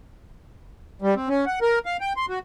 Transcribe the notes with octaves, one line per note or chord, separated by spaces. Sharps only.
G3
C4
C#4
F#5
A#4
F5
G5
C6
F#4